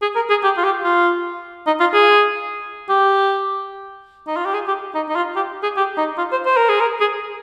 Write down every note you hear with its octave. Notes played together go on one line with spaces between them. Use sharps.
G#4
A#4
G#4
G4
F4
G4
F4
D#4
F4
G#4
G4
D#4
F4
G4
G#4
G4
D#4
D#4
F4
G4
G#4
G4
D#4
F4
C5
C5
A#4
G#4
A#4
G#4